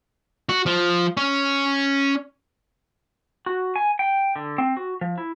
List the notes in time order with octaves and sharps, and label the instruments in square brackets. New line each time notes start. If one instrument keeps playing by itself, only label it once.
[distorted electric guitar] F#4
F3
C#4
[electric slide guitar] F#4
G#5
G5
D3
C4
F#4
F3
E4